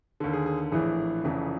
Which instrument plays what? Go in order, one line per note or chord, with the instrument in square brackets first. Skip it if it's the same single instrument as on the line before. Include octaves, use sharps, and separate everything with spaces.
[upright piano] D#2 D3
G#4
G#4
A#1 A2 E3 G#4
F1 F2 C#3 E3